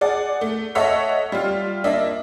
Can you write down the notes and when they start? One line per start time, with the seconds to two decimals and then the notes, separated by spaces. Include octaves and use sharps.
0.01 G#4 D5 F#5
0.41 A3
0.75 A4 C#5 D#5 E5 F#5
1.32 G3 F4
1.84 A#3 D4 D#5 E5